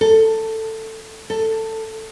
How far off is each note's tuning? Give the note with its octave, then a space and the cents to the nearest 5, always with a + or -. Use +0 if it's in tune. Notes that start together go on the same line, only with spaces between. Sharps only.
A4 +15
A4 +15